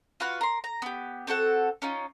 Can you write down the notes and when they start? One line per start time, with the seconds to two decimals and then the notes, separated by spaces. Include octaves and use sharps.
0.20 F4 F#4 B4 F5
0.41 A#4 C6
0.64 A#5
0.82 B3 G4
1.27 C4 F#4 A4 F#5
1.82 C#4 D#4 F4